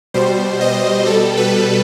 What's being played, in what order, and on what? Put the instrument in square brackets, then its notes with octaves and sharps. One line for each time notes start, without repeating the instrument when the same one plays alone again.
[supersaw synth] B2 G3 C5
D#5
B2 G3 A4
B4